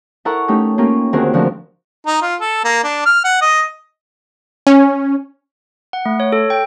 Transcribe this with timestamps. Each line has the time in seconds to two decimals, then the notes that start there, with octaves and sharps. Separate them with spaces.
0.25 E4 A4 A#4 F#5 A#5 C#6
0.48 A3 C#4 D#4 G4
0.78 A#3 C#4 F4 G4 A#4
1.13 D2 D#3 C4 F#4 G#4 A#4
1.33 D3 F3 A3 C4 F#4 A#4
2.06 D#4
2.22 F4
2.41 A4
2.64 A#3
2.84 D4
3.06 F6
3.25 F#5
3.42 D#5
4.67 C#4
5.93 F#5
6.06 A3
6.20 C#5
6.32 A4
6.50 G5